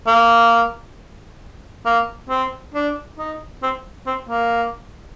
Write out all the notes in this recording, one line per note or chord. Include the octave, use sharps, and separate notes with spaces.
A#3
A#3
C4
D4
D#4
C4
C4
A#3